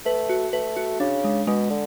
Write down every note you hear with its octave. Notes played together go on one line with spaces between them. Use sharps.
A3 B4
F#4
A3 B4
F#4
C#3 D4
G#3
B2 G#3
D3